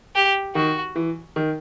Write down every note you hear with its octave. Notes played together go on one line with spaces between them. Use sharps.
G4
D#3 F#4
E3
D#3